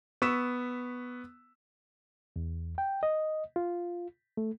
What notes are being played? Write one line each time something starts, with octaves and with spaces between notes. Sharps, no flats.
B3 C#6 E6 B6 E7
E2
G5
D#5
F4
A3